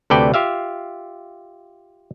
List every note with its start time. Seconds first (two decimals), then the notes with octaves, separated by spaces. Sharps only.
0.10 D2 C3 A4 B4 D5 G5
0.34 F4 G4 E5 F5